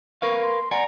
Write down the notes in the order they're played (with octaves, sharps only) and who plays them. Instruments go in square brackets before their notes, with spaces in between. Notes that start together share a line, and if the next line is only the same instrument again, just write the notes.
[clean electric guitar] A#4 B4 F5 [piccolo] C#6
[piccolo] C6
[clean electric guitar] D5 F#5 G#5 [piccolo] A#5